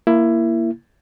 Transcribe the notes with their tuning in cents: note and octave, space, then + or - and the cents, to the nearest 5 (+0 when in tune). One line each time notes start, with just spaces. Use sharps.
A#3 +0 E4 +15